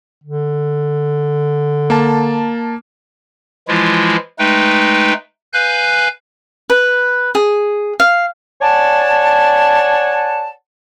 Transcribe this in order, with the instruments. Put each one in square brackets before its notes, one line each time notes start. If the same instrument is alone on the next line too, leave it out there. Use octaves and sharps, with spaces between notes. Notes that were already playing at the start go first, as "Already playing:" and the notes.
[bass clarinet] D3
[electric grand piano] A#3 A5
[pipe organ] E3 F3 G#3 E4 F4
G#3 A3 D#4 B4 G5
B4 F5 G#5 F#6 G6
[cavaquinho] B4
G#4
F5
[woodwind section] C#5 D5 F#5 G#5 A5